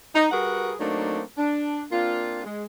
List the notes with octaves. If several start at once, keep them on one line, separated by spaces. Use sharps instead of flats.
D#4
G3 F#4 G#4 A#4 B4 F#5
F#3 A3 A#3 C4 D4 D#4
D4
A#3 C4 D4 F4
G#3